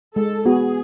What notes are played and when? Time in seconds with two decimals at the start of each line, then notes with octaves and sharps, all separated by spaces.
0.16 G#3 A4
0.46 B3 F#4 G#4